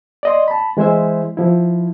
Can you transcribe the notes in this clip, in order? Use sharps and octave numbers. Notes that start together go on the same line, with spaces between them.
D5 D#5 C6
A5 B5
E3 G#3 E4 C5 E5
F3 E4